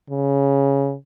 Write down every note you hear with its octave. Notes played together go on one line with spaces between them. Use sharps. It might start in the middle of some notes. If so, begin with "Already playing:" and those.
C#3